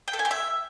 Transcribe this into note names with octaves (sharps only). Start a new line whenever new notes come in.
G5
A4
G#5
G4
E5